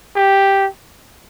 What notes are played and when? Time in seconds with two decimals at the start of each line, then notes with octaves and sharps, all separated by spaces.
0.16 G4